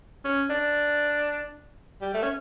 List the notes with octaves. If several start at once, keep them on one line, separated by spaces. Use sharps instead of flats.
C#4
D4
G3
A3
C#4